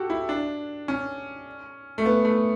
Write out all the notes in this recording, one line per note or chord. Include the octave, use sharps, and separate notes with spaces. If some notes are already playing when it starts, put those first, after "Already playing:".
Already playing: F#4 G4 A4
E4
D4
C#4
A3
B3
A3